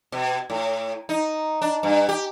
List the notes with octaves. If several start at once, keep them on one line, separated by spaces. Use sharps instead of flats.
B2
A2
D#4
D4
G2
G4